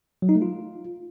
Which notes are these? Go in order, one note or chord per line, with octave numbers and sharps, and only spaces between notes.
F#3
D#4
A3
F4